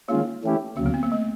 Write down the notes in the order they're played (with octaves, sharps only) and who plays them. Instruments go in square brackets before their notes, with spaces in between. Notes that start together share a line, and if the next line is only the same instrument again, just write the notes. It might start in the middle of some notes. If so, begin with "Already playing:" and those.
[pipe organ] D#3 G#3 C#4 F4 [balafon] A#3
[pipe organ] E3 A3 C#4 E4 G4
[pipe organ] D2 C#3 F#3 [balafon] A#3
[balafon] B3
C4
A#3
A3